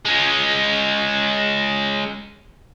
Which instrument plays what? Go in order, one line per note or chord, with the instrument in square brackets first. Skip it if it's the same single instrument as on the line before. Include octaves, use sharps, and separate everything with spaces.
[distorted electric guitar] G#3 C#4